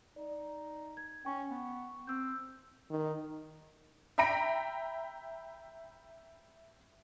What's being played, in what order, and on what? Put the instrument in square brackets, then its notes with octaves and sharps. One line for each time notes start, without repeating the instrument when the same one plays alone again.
[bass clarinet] D#4 [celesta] D5
[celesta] G#6
[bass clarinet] C#4 [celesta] G5 C#6
[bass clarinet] B3
[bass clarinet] C4 [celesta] E6 G6
[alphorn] D#3
[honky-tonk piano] E5 G5 A#5 B5 A#6 D7